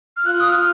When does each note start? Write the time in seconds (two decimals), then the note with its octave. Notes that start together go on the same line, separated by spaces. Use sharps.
0.17 F6
0.26 F4 F#6
0.40 D#6
0.49 F6
0.57 F4